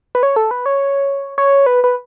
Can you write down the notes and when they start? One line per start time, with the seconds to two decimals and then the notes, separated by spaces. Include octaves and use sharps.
0.15 B4
0.23 C#5
0.36 A4
0.51 B4
0.66 C#5
1.38 C#5
1.66 B4
1.84 B4